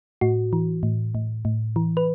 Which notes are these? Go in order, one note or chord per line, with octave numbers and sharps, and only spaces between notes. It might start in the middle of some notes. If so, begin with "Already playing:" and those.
A2 F#4
E3
A2
A2
A2
E3
B4